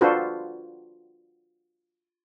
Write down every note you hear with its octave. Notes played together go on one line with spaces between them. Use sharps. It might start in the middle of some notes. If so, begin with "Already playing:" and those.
D4 F4 F#4 A4 B4 C5